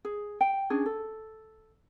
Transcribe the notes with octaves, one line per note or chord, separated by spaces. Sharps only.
G#4
G5
C#4 D4 G#4
A4